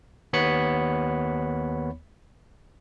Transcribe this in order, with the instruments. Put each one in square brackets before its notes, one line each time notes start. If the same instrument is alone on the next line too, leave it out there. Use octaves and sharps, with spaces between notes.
[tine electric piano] D#2 B3 C#5 B5 C#7